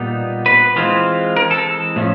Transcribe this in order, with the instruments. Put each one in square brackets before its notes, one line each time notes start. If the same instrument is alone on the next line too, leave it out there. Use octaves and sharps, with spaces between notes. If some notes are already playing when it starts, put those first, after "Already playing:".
Already playing: [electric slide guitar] A#2 G3 B3 D#4
B4
E3 G#3 C4 F4
A#4
A4
A2 F3 A3 C#4